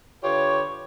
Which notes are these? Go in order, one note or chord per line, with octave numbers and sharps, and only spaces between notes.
D3 F4 G4 B4 C#5